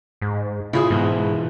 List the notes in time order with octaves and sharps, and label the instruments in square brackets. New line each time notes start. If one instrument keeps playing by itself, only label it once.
[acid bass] G#2
[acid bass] C#3 [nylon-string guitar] E4 F4 G#4
[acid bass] G#2 [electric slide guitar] B2 E3 B3